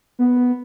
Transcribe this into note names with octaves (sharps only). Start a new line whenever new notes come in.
B3